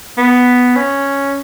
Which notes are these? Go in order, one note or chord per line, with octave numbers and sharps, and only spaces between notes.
B3
C#4